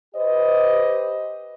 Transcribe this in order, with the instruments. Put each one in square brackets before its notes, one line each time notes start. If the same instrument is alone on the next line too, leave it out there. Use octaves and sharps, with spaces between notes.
[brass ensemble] G4 B4 C5 D#5